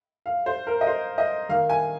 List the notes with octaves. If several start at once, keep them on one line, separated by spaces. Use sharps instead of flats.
F5
C5
A#4
D#5
C5
D#5
D#3 A#3 F5
G#5